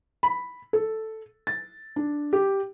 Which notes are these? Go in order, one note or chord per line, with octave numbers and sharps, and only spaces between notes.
B5
A4
A6
D4
G4